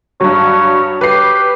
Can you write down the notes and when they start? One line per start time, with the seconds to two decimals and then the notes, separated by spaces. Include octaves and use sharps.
0.21 G2 F#3 C#5
1.01 G4 B4 C7